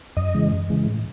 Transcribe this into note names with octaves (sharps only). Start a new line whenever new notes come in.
F#2 D#5
C#3 E3 G#3
F#2
C#3 E3 G#3
A2